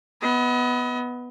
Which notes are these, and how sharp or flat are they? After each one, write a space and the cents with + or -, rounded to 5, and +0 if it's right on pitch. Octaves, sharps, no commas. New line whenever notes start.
B3 +0 D#5 +35